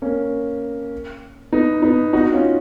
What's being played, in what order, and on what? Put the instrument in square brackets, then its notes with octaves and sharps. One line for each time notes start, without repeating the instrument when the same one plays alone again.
[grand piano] A#3 C#4
B3 D#4
B3 D#4
D#4 F#4
C#4 F4